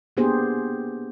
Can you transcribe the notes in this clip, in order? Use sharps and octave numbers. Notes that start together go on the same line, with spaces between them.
A#3 B3 D4 G4 G#4 C5